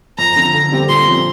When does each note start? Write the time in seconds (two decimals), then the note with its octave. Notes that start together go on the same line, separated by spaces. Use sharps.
0.18 F2 A#5
0.36 D3 F3 C4
0.54 D3
0.71 G3 C4 G4
0.88 A#2 C6
1.07 F3 C4